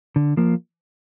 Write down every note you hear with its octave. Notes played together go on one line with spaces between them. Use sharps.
D3
F3 A#3